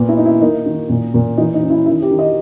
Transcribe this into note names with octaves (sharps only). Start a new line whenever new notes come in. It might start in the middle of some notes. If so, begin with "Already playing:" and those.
Already playing: A#2 B3
E4
D#4
E4
A#3 D#4
D#3
A#2
A#2
E3 D#4
D#4
C#4
E4
D#3 E4
G4
D#3
D#5